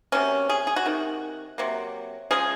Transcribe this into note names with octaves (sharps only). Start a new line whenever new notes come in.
C3 F#3 A#3 C#4
G#4
G#4
F#4
C3 D#3
C3 F#3 A#3
C#3 F3 G#3 G#4